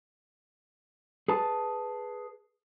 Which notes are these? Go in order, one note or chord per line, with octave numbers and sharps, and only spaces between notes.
G#4 B4 A5